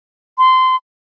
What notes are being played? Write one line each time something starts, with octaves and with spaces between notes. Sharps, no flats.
C6